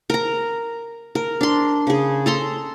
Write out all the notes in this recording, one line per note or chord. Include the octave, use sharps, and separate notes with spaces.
A#4 A#5
A#4
D4 C6
C#3 G#4
A4 A#5 C6